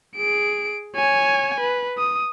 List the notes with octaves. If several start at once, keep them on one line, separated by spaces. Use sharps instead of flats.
G#4 D7
C#5 G#5
B4
D#6